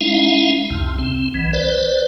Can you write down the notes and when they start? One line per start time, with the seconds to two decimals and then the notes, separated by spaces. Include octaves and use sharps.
0.01 G#3 C#4 D#4 E4 E5 F5
0.70 C2 F2 C3
0.99 C4
1.34 B1 E3
1.53 B4 C5 D5